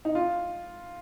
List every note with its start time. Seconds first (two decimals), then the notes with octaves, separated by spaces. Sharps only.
0.05 D#4
0.15 F4